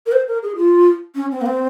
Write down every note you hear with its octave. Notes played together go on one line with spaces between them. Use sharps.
A#4
C5
A#4
G#4
F4
C#4
C4
A#3
C4